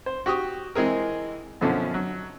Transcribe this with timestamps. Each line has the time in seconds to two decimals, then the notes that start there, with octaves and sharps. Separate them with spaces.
0.06 C5
0.26 F#4 G4 C#6 D#6
0.75 E3 G#3 C4 G#4 A#4
1.61 F#2 B2 D3 F3 C#4
1.94 F#3